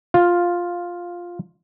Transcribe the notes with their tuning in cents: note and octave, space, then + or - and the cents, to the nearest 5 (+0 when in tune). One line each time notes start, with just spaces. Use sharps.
F4 +5 F5 +0